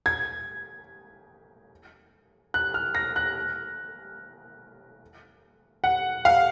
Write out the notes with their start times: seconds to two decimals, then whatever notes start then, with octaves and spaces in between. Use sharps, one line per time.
0.06 G#6
2.54 F#6
2.74 F6
2.95 A#6
3.16 F#6
5.84 F#5
6.25 F5